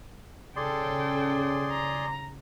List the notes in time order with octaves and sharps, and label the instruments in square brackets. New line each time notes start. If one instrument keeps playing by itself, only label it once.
[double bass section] C#3 [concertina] G#4 D5 C6 [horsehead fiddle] A4 G5
[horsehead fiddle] A#5